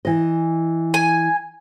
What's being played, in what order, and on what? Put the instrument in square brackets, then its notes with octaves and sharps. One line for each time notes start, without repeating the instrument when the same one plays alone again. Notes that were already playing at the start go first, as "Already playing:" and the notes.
[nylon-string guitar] E3 D#5
[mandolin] G#5